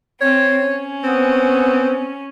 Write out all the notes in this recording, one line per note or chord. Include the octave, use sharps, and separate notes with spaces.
C4 C#5
C#4
B3 C4